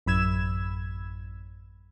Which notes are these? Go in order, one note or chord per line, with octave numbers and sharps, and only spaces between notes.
A1 F#2 B5 E6 G#6 E7